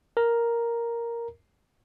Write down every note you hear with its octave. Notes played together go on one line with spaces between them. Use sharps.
A#4 A#5